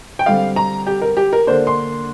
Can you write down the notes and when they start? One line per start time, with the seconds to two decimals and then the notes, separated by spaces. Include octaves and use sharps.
0.19 G5
0.26 D3 G3 C4 F5
0.56 A#5
0.87 G4
1.02 A#4
1.17 G4
1.33 A#4
1.47 D3 A#3 D4 C5
1.67 C6